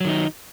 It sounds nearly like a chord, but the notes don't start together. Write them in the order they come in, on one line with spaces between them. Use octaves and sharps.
F#3 D#3 D#4